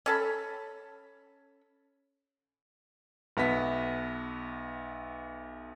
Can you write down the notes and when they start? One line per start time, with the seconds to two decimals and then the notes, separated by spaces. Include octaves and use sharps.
0.06 C#4 A4 B5
3.37 B1 B3 E5 B6